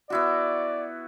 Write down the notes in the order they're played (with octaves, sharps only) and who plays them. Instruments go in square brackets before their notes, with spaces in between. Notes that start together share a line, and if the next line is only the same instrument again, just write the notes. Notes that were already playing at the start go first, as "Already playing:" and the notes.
[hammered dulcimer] B3 E4 F#4 [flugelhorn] D5